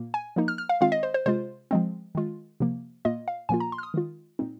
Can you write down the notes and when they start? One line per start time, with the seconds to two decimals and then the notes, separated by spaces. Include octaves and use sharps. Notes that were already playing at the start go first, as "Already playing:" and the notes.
Already playing: A#2 A#3
0.14 G#5
0.36 F3 A#3 D#4
0.48 F6
0.58 F6
0.69 F5
0.81 D#3 G#3 C4 F4 F5
0.92 D#5
1.03 C5
1.14 C5
1.26 C3 G#3 F4 C5
1.71 F3 G#3 C4
2.15 D#3 G#3 F4
2.60 C3 F3 A#3
3.05 A#2 A#3 F4 D#5
3.28 F5
3.49 A#2 F3 A#3 F4 G#5
3.60 A#5
3.72 C6
3.78 F6
3.83 D#6
3.94 D#3 G#3 F4
4.39 A#2 G#3 C4 D#4